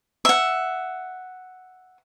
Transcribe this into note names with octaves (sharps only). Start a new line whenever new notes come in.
E5 F#5